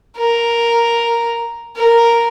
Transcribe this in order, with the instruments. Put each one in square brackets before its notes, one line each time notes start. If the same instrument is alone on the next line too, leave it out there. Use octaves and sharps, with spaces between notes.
[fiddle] A#4
A#4